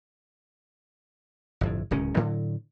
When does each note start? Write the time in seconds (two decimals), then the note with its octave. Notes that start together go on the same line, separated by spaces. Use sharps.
1.61 G1 F2 A2
1.91 D1 C#2 D#3 C#4
2.16 A2 D3 F#3